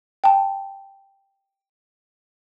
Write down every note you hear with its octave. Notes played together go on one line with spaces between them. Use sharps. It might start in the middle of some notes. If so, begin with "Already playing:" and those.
G5 A5